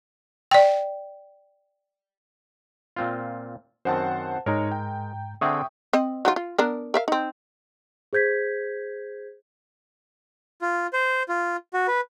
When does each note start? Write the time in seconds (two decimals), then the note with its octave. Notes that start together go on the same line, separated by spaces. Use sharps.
0.51 D5 G5
2.96 A#2 C4 F4
3.85 F#2 D#3 C4 C5 F#5 A5
4.46 G#2 G#3 D#4 A#4 C#5 A#5
4.72 G5
5.41 D3 C4 G#4 E5 G5 C#6 D#6
5.93 C4 D#5
6.25 F#3 D#4 F4
6.36 F4
6.58 B3 D4 A#4
6.94 A#4 E5 F5
7.08 C4 D#4
8.13 G#4 C5 G6 G#6 B6
10.62 F4
10.93 C5
11.29 F4
11.74 F#4
11.88 B4